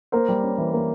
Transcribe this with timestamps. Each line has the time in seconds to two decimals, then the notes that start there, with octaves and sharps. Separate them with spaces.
0.12 A#3 A#4 C5
0.29 G3
0.43 C#4
0.58 E3
0.73 A#3